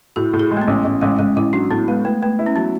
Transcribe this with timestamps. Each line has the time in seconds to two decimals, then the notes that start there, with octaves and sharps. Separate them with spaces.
0.16 A2 F#4
0.34 A2
0.39 G#4
0.51 G#3
0.57 A3
0.61 B3
0.68 A1
0.85 A1
1.01 A1 G#3
1.19 A1 G#3
1.36 A1 E4
1.53 F#3 D4
1.71 A2 B3
1.88 G#3 B3
2.05 A3 B3
2.22 A3 B3
2.39 E4
2.46 C#4
2.56 F#3 B3